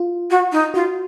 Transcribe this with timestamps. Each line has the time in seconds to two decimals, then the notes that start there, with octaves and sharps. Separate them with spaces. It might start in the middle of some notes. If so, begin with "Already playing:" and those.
Already playing: F4
0.30 F#4
0.52 D#4
0.74 F4 F#4